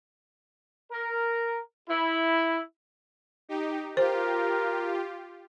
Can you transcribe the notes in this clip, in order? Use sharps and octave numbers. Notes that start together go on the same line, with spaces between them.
A#4
E4
D#4 G4
F4 G4 A#4 C5